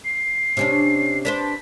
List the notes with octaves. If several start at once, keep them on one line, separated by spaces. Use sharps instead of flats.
C7
C3 C#4 D4
D4 B4 C5 B6